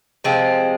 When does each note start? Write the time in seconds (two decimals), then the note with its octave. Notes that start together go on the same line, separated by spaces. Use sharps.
0.24 C3 F3 G#3 C4